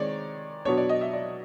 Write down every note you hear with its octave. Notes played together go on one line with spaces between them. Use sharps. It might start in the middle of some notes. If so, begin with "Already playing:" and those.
Already playing: D#3 G#3 C4 C#5 D5
B2 F#3 B3 D4 C#5
D5
D#5
E5
D5